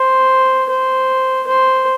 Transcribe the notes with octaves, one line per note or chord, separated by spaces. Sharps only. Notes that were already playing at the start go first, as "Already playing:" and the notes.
Already playing: C5
C5
C5